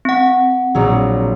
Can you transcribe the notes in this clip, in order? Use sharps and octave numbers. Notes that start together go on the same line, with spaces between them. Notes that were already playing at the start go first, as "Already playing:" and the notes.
C4 F#5
A#1 F#3